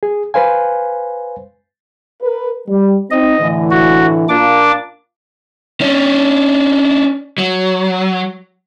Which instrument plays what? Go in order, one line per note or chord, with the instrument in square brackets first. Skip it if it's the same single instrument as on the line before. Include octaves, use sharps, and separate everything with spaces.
[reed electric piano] G#4
B4 C5 F5 G#5
[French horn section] A#4 B4
G3
[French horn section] C4 D#4 [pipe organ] D#5
[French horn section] A2 D3 E3
[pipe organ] F#4
[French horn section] A#2 A#3 F4 [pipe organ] D4 D6
[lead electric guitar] C#4 D4
F#3